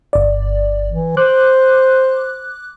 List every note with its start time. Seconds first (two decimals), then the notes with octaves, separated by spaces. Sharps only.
0.13 G1 D5
0.89 E3
1.17 C5 D6 F#6